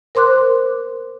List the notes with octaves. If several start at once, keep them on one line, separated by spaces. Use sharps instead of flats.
A#4 C5 C6 D6 F#6